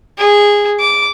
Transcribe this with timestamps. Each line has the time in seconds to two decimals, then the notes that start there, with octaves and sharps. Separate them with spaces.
0.18 G#4
0.80 D6